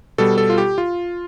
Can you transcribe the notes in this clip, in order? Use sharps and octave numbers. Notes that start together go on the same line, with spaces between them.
B2 G3 A4
A4
F4
G4
F4